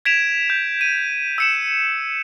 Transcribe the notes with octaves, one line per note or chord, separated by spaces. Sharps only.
G#6 B6 D7 E7 F7
G6
D#7
E6 C#7 E7